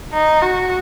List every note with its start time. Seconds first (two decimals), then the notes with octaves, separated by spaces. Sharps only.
0.13 D#4
0.42 F#4